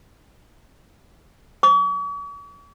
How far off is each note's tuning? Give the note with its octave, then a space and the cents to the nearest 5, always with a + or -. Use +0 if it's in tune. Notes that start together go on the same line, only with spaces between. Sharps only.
C#6 +45